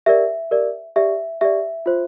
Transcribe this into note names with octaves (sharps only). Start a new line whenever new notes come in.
G4 A#4 D5 E5
G4 A#4 D5
G4 D5 E5
G4 D5 E5
F4 C5